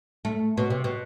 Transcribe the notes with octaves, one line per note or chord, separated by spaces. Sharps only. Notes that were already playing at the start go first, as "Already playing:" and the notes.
A3
B2
C3
B2